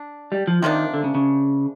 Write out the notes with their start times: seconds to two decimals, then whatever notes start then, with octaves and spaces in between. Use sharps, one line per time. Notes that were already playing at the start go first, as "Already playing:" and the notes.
Already playing: D4
0.32 G3
0.48 F3
0.62 C3 D#3 F3 A#3 D4
0.94 D3
1.04 C#3
1.15 C#3